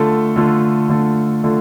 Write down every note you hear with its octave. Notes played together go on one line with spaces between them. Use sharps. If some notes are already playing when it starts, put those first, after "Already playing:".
Already playing: D3 A3 F4 A4
D3 A3 F4 A4
D3 A3 F4 A4
D3 A3 F4 A4